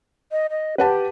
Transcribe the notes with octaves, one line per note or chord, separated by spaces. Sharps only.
D#5
D#5
G4 B4 F#5 A5